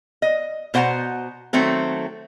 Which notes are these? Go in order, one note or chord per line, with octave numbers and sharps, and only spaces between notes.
D#5
B2 C5 F#5 G5 A#5
D#3 F#3 A3 C4 A4